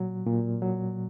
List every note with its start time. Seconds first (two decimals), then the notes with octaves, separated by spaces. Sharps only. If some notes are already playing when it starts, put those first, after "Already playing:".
Already playing: A#2 F#3
0.26 A#2
0.62 F#3